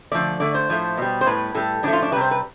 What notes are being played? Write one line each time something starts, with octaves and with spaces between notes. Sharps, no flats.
D3 F3 A3 D5
D3 A3 D5
C5
A2 F3 A3
B2 G3
C5
A2 G3 B4
A2 G3 A4
A2 F3 A3 D4
F4
D4
C3 G3 B4 C5
B4